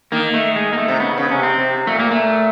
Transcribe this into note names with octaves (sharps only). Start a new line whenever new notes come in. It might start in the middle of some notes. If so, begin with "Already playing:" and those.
D#3 A#3
A3
G#3
A#3
A3
C3
C#3 B3
C#3
C3 C#4
C4
C3
A#2 A3
A#3
A3